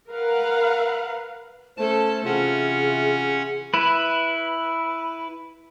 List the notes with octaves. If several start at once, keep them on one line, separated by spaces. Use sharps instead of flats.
A#4 B4 F5 F#5
A3 C#4 A4 C5 A5
C3 E3 C#4 F4 G#4 F#5
E4 B4